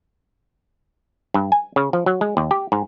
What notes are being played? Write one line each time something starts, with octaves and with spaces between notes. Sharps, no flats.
G2
G#5
C#3
F3
F#3
G#3
D#2
G4
G#2